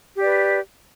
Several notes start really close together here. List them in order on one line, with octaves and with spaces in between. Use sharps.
G4 D5 B4